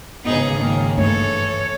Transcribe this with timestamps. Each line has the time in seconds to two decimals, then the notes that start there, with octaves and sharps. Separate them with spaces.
0.24 G#1 C#3 B3 D#4 G#4
0.57 D#3 A#3
0.98 G2 E3 A3 A#3 A4 C#5